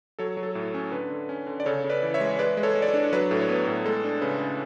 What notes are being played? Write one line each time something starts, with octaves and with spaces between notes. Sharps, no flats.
F#3 A4 C#5
F#3
A4
A2
C#4
D3 B4
D3
C#4
D3
D5
C#3 A4 C#5
C#3
B4 D5
E3
C#5 E5
G#3
G#3 B4 D5
G#3
A4 C#5
G#3
D5
A4 C#5
D4
F#3 B4
A2 A4
C#5
B3 B4
A2 A4
G#3 A4
D4
C#3 B4
C#3